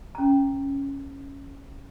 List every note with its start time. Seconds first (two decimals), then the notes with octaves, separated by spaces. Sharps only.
0.15 C#4 A#5